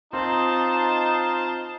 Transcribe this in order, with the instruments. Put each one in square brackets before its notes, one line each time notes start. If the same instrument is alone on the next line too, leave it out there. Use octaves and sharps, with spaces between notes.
[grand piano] C4 [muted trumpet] D#4 [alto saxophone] F4 [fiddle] C5 A5